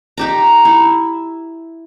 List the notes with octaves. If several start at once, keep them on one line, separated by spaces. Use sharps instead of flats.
D#4 G4 A#5
E4